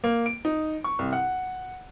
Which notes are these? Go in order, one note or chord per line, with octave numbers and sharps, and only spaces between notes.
A#3
D7
D#4
C#6
C2
F#5